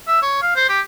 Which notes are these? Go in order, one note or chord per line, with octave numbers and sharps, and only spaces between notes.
E5
C#5
F5
C5
G4